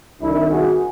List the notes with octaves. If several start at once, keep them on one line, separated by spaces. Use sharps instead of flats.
C2 C3 D#3 D4 E4
F#4 G#4